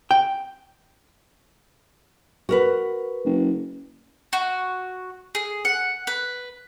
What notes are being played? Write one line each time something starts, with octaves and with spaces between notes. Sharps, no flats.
G5
F#4 A#4 B4
F#1
F#4
G#4
F#5
B4